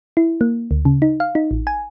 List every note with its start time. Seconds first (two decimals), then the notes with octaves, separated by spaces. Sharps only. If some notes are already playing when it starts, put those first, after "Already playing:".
0.17 E4
0.41 A#3
0.71 D2
0.85 C#3
1.02 D#4
1.20 F5
1.35 D#4
1.51 A1
1.67 G#5